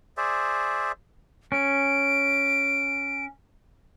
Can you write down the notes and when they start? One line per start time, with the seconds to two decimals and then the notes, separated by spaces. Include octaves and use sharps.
0.17 G#4 C5 D5 E5
1.52 C#4 D7